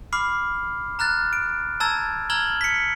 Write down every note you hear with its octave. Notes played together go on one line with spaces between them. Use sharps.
B5 D6 F6 C7
A#5 F6 F#6 A6
D7
A5 A#5 E6 G#6 A6
A#5 E6 F6 G#6 F#7 G7
B6 C#7